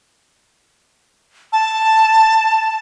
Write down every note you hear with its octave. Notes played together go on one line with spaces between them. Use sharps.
A5